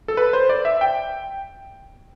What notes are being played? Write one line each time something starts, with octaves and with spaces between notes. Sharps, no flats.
A4
B4
C5
D5
E5
G5